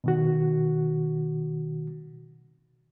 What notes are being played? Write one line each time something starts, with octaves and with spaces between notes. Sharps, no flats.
B2 D#3 F#4